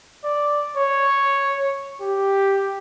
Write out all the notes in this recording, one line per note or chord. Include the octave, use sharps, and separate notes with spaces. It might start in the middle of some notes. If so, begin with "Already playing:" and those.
D5
C#5
G4